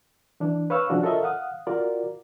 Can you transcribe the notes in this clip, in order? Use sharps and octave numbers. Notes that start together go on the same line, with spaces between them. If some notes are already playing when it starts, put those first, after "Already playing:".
E3 D4
B4 C#5 F5 C#6 E6
C#3 F3 C#4 D4 F#4
F4 A4 A#4 C#5 D#5 E5
F5 F#5 D#6
F4 F#4 A#4 D5